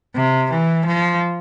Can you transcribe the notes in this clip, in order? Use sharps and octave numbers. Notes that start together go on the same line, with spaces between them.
C3
E3
F3